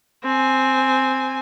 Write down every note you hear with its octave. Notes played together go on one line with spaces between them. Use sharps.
C4 G#5